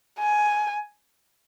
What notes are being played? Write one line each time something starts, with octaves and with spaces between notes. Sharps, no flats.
G#5